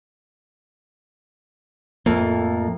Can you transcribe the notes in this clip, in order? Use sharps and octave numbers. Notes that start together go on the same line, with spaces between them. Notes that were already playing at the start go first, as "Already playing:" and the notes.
F2 A2 A3 A#3